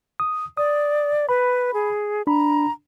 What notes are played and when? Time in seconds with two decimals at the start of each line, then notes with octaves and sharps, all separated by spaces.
0.20 D#6
0.57 D5 D#6
1.29 B4 B5
1.74 G#4
2.27 D4 A#5 B5